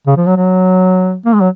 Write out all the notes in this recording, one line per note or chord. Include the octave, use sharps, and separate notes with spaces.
C#3
F3
F#3
F#3
A#3
G#3
F#3